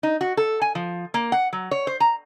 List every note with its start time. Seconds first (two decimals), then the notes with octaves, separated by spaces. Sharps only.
0.03 D#4
0.21 F#4
0.37 A4
0.62 G#5
0.75 F3
1.14 A#3
1.32 F#5
1.53 F#3
1.71 C#5
1.87 C5
2.00 A#5